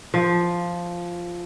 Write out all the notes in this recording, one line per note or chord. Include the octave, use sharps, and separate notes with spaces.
F3